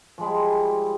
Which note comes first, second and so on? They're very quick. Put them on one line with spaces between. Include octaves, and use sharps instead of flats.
F3 G#3 E4 G3